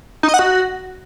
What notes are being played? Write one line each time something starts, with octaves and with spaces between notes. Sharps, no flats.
D#4
D#5
F#5
F#4